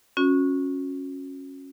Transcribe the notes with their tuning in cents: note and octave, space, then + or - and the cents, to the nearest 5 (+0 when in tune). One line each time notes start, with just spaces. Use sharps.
C#4 -10 F#4 -30